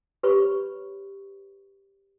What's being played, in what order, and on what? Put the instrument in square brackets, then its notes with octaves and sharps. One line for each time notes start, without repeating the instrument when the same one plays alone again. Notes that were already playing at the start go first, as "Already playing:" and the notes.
[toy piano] G4 B4 C#5 B5 C#6